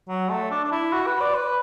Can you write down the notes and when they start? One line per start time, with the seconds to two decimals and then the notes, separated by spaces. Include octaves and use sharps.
0.08 F#3
0.30 A3
0.51 D4
0.64 D4
0.72 E4
0.93 F#4
1.07 B4
1.21 D5
1.34 B4